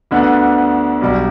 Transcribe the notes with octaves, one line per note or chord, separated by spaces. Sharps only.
D2 D3 B3 D4
B1 B2 G3 D4